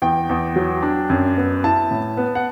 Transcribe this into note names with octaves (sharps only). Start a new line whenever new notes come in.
E2 G5
E2
F#3
D4
F#2
B3
E4 A5
A2
B3
F#5